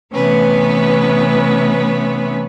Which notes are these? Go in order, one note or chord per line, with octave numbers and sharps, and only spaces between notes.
C3 E3 A3 B3 C#4 B4